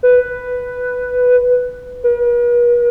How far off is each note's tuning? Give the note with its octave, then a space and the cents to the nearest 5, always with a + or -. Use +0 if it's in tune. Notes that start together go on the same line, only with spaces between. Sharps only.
B4 +5
B4 -45